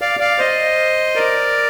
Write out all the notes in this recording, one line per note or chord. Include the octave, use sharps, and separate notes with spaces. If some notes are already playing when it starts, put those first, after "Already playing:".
D5 F5
D5 F5
C5 D#5
A#4 D5